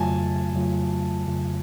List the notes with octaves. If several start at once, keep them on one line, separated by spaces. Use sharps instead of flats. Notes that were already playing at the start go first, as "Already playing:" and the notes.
Already playing: F2 C#3 F#3 A3 F4 G#5 A5
F2 C#3 F#3 A3 F4
F2 C#3 F#3 A3 F4